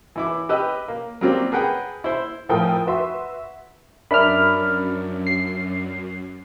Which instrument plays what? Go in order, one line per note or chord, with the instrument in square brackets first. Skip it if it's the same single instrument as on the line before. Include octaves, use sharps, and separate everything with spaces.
[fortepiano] E3 E4 D6
G4 B4 D#5 E6
A#3
F#3 G3 A#3 C4 F4 G4
G#4 A#4 B4 F#5 G5
E4 C5
[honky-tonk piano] A2 F3 A#4 G5 G#5 D#6
F#4 B4 E5 C6
[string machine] F#2 [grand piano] D4 A#4 E5 [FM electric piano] B5 F6
[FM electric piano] C7